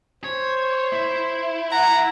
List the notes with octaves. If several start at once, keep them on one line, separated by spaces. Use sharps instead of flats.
C5 C#5
E4
F#5 A#5